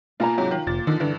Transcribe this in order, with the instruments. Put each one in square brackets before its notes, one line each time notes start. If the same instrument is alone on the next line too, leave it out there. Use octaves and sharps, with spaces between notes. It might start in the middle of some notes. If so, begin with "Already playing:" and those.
[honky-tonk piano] B2 A#3 [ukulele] F4 G#5 A#5
[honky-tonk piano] G#2 C3 [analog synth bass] F#3
[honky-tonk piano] D#3
[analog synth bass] F1 [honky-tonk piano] A#2 A6
[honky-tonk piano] D3 F3 [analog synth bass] D#3
[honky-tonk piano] G2 E3 [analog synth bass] D3